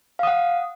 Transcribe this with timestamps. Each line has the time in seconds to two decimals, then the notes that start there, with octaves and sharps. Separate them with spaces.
0.19 F5
0.23 D#6
0.27 F#5